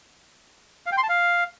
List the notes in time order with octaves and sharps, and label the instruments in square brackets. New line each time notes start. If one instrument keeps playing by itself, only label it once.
[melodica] F5
G5
C6
A5
F5